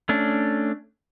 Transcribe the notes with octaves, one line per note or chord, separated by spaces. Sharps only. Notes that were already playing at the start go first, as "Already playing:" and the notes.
A3 C#4 D4